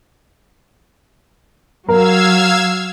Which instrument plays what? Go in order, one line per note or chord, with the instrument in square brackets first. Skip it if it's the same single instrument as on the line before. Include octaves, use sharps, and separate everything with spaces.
[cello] F#3 [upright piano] A#4 [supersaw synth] F5 E6 G#6